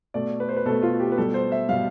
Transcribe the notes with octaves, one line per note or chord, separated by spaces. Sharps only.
B2 A3 D5
B4
C5
B4
B2 A3 A4
F4
G4
B4
B2 G3 A4
C5
E5
B2 G3 F5